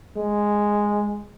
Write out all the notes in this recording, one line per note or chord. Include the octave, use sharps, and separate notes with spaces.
G#3